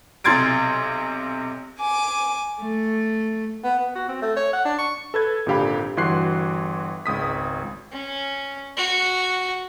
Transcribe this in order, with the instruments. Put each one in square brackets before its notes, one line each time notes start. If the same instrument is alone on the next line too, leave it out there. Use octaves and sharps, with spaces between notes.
[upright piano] B1 C3 C6 G#6 A6 D7
[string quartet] G#5 D6
A3
[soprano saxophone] B3
B3
F#4
C4
A3
C#5
F#5
D4
C#6
[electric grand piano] A4 B4 G#6
G#1 A#2 D3 G4 F5 B5
G1 E3 F#4 C6 F#6 C7
G#1 C#2 D#6 B6
[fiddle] C#4
F#4